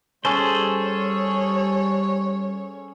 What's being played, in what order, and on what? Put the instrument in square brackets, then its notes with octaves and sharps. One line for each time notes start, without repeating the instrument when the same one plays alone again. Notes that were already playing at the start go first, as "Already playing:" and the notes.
[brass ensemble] G3 [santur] C#4 [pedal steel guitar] G#4 A4 C5 [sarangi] C#5